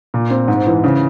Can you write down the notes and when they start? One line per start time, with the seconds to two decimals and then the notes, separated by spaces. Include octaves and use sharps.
0.14 A#2
0.30 C4
0.48 G#2
0.66 E3
0.84 C#3